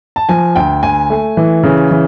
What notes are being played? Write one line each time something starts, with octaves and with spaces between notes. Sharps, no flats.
A5
F3 G#5
D2 G5
D2 G#5
A3
E3
C#3
E3